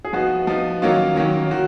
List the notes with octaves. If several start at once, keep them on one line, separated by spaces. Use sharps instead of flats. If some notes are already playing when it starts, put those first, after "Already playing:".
G#4
F3 B3 D#4 F#4
F3 B3 D#4
D#3 F#3 A#3 C#4 F4
D#3 F#3 A#3 C#4
D#3 F#4